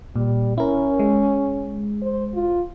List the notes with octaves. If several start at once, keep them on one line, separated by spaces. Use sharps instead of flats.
A#2 G3
C#4 E4 A#4
G#3
C5
F4